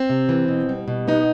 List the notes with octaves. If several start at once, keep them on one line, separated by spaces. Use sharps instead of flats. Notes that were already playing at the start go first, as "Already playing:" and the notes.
Already playing: C4
C3
E3
B2
G3
B2
B3 D#4